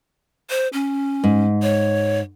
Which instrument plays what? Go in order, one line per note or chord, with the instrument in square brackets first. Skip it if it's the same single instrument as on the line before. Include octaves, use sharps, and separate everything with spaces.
[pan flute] C5
C#4
[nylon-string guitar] G#2
[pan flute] C#5